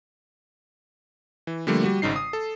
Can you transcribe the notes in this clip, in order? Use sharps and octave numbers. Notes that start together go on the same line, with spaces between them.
E3
D3 F3 G3 A3 A#3
G3 F#4
G#1 G#2 C#3 D#4 C7
D#6
A4